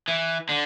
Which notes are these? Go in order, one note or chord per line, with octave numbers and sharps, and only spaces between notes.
E3
D3